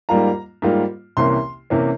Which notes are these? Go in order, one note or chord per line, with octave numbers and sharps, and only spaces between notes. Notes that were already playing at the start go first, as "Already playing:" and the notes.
G#2 G3 A#3 F4 A#5
G#2 G3 A#3 F4
C2 C3 E3 A#3 C#4 C6
C3 E3 A#3 C#4